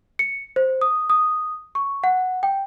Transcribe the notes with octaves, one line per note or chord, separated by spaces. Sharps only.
C#7
C5
D#6
D#6
C#6
F#5
G5